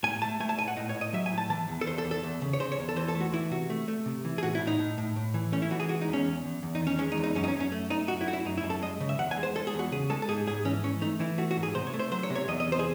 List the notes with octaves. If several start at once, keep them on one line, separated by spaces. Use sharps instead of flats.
A2 G#5
A3 A5
A3 G#5
A5
A2 G#5
F#5
A2 D#5
C#5
A2
D#5
F#3 E5
G#5
A2
A5
E3 A5
E2
A4
E2 C5
A4
E2
A4
E2
C#3
C#5
C#3 C5
C#5
E2
A4
E3 C5
A4
A3
F#4
E3 E4
C3 F#4
A3
A3
C3
E3
G#4
A2 F#4
E4
A2
D#4
A2
A2
A2
E3
A3 C#4
E4
E3 F#4
G#4
G#3 F#4
D#4
E2
C#4
E2
E2
E2
D#4
D#3
C#4
G#3 C#4
D#4
E2
D#4
F#2 C#4
D#4
C#4
F#2
C#4
A3
A3 D#4
F#2 F#4
E4
A3 F#4
E4
F#2 D#4
E4
F#2
A4
G#3 D#5
C#3
E5
E2 F#5
G#5
G#3
C5
G#3 A4
G#4
E2
F#4
C#3 G#4
G#3 A4
A4
G#2 G#4
G#2 G#4
E3 C#4
E3 C#4
A3 D#4
E3 E4
A3 F#4
F#4
G#2
G#4
C3 C5
C#5
A3
C5
F#3 C5
C#5
C3
C#5
E2 D#5
D#5
C3
C5
G#4